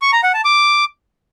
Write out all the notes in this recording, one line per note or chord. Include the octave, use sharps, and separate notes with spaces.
C#6
A#5
F#5
A5
D6